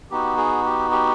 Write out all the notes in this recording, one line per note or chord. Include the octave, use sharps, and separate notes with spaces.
B3 D#4 F#4 G4
G#4
G4
G4